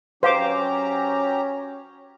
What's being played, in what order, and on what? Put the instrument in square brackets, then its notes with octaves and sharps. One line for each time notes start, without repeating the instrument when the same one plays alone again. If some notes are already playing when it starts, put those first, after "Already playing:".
[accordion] F#3 G4 A#5 [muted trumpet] C#4 [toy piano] B4 F5 [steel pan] C5 D6